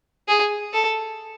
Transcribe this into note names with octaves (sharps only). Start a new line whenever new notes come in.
G#4
A4